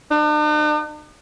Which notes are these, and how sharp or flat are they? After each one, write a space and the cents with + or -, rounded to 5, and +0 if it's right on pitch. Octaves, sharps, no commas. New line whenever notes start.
D4 +45